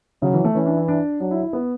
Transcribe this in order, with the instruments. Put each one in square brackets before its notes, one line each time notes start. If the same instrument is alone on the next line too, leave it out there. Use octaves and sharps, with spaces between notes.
[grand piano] C#3 [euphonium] F#3
[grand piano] E3
A3
[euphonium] E3 [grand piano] C#4
[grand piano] D4
E4
D4
[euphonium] F#3 [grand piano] D4
[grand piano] E4
E4
B3